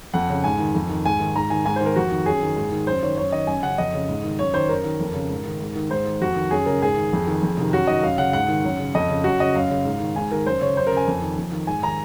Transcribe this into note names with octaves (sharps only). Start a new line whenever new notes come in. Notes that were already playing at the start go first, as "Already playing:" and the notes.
F2 F#5
C#3
G#2 G#5
D#3
F2
D#3
G#2 G#5
D#3
G#2 A#5
D#3 G#5
G#2 G#5
C5
D#3
A#4
F2 F#4
D#3
F#2 G#4
D#3
G#2
D#3
F#2 C5
D#3 C#5
F#2 C#5
D#3 D#5
F#2 G#5
C#3 F#5
F2 D#5
C#3
G#2
D#3
F#2 C#5
D#3 C5
F#2 A#4
D#3
F2
C#3
G#2
D#3
G#2
D#3
G#2 C5
D#3
F2 F#4
D#3
F#2 G#4
C#3 A#4
G#2 G#4
D#3
F2
D#3
F2
C3 D#3
F#2 F#4
D#3 D#5
F#2 F5
C#3 F#5
G#2 F#5
D#3
F#2
C#3
F2 D#5
C#3
F#2 F#4
C#3 D#5
F#2 F5
C#3
G#2
D#3
G#2 G#5
D#3 A#4
F#2 C5
C#3 C#5
F#2 C5
A#4
C#3 G#5
F2
D#3
F2
D#3
G#2 G#5
D#3 A#5